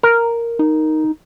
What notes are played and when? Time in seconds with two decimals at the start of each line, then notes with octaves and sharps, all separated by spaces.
0.03 A#4
0.59 D#4